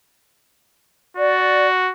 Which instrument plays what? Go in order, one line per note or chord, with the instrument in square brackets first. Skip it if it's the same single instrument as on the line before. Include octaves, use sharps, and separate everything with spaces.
[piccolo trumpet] F#4 [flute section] D5